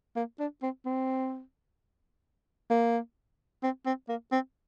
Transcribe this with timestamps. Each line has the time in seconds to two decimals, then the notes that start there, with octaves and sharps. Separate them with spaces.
0.16 A#3
0.40 D4
0.62 C4
0.85 C4
2.70 A#3
3.63 C4
3.86 C4
4.08 A#3
4.32 C4